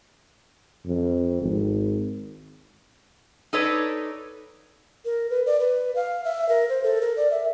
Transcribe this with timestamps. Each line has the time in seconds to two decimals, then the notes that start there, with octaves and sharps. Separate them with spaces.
0.86 F2
1.42 G#1
3.53 D#4 A4 B4 C#5 D5
5.05 A#4
5.30 B4
5.46 D5
5.60 B4
5.96 F5
6.25 E5
6.49 A#4
6.69 C5
6.84 A4
7.01 A#4
7.17 D5
7.31 E5